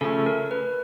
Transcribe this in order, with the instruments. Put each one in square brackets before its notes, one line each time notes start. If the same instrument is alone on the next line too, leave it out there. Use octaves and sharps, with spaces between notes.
[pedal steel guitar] C#3 F3 A3 C#4 [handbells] A4
[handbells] A#4
B4